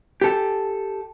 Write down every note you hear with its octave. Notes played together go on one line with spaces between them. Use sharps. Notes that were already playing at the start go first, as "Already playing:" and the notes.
G4 A4